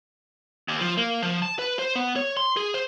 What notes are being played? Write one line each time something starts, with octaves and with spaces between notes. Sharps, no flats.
D#2
F3
A#3
F3
A5
B4
C5
B3
C#5
C6
G#4
C5